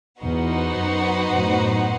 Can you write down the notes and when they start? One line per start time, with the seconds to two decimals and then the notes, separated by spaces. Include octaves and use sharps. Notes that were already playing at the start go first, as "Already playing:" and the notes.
0.22 E2 B3 D#4 F#4 C5 F#5
0.77 F#2
1.32 F#2 A2